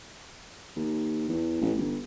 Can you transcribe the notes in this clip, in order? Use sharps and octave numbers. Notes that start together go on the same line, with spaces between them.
D#2
E2
A1
G1